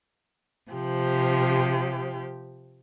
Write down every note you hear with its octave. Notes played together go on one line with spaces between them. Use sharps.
C3 F3 G4